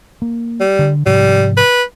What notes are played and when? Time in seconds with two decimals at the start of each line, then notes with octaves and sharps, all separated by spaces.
0.22 A#3
0.60 G3
0.79 D3
1.06 G#2 C3 F3 G3
1.57 B4